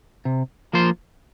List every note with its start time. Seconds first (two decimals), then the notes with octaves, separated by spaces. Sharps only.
0.25 C3
0.73 F3 A#3 F4 C5